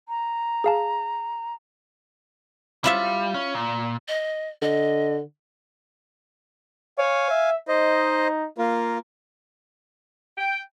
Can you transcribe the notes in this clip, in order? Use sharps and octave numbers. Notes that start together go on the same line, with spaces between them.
A#5
G#4 F5 A5
G3 E4 F4 E5
C#4
A#2
D#5
D3 D#5
C#5 F5 G#5
E5
D#4 C5 D#5
A#3 F4 A#4
G5